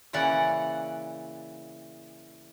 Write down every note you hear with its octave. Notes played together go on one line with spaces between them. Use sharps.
A#2 C#3 E3 D5 F#5